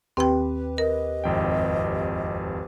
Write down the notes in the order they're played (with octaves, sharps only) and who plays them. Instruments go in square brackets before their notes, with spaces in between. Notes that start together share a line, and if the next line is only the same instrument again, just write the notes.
[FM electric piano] D#2 G4 B4 [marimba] C4 G5
[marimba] A#4 [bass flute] D#5
[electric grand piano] G#1 F2 G5